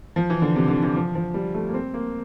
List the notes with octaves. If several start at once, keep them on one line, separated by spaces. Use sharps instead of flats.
F3
E3
D3
C3
D3
E3
F3
F3
G3
A3
A#3
C4
A#3